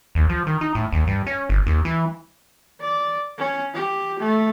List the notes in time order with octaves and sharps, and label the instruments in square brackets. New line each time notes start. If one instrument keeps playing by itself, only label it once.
[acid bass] D#2
F3
D#3
D#4
A2
D#2
G2
C#4
G1
D#2
E3
[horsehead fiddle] D5
C#4
G4
A3